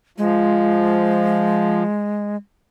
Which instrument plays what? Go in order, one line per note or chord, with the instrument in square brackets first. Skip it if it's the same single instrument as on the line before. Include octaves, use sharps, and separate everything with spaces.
[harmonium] F3 [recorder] G#3